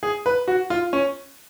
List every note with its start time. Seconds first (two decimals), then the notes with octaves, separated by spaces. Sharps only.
0.03 G#4
0.26 B4
0.48 F#4
0.70 F4
0.93 C#4